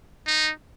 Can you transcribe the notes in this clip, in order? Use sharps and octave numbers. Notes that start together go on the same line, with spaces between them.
D#4